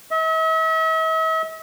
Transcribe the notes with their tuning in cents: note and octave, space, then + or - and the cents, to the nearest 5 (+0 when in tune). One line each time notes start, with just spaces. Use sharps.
E5 -45